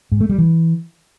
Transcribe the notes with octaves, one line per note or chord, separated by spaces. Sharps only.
G#2
A3
G3
E3